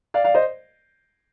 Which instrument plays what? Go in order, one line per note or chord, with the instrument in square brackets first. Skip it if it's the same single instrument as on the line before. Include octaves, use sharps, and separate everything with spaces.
[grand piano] D5 F5
D5 F5
C5 D#5